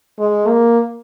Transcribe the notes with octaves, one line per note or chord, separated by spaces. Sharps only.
G#3
A#3